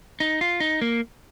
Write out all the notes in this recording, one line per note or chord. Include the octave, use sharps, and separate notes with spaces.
D#4
F4
D#4
A#3